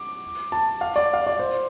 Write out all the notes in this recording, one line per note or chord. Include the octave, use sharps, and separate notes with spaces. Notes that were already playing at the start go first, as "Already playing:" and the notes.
Already playing: D6
A5
F5
D5
F5
D5
C5